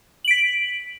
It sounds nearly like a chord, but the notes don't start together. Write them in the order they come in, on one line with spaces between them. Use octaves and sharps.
F#7 D7 B6